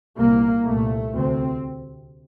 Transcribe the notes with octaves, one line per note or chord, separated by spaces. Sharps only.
C2 A#2 A#3
C2 A#2 A3
D2 C3 C4